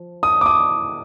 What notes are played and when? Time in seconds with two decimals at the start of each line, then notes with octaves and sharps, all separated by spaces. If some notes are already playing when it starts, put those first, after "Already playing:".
Already playing: F3
0.23 D#6
0.41 D6
0.46 D#6